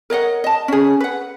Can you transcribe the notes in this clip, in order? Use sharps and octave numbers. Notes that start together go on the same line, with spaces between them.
A#4 C#5 D#5 F#5
D#5 A5
C#4 G#4
B4 F#5